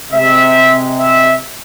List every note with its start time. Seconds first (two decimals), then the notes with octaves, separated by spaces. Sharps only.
0.11 C3 G#3 E5
0.99 E5